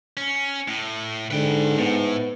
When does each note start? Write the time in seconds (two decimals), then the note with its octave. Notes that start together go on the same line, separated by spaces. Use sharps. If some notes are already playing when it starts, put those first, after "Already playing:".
0.17 C#4
0.68 A2
1.31 G#2 D3 B4 G5
1.78 A2 B3